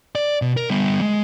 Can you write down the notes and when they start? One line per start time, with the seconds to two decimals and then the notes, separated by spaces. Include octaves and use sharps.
0.15 D5
0.42 B2
0.57 A#4
0.70 G3 B3
1.01 G#3